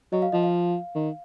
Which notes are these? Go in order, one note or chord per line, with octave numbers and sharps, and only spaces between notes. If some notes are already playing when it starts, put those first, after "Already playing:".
F#3 D#5
F5
F3 D#5
F5
D#3